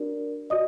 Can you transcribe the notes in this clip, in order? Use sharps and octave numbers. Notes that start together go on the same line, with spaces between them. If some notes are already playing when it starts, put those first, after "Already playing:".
Already playing: D4 F#4 A#4 D5
F#4 D5 D#5 D#6